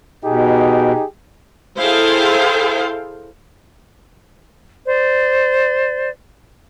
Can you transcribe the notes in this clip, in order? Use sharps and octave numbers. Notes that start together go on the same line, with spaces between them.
B2 D#4 G4 G#4
E4 G#4 A4 C5 F5 G5
C5 D5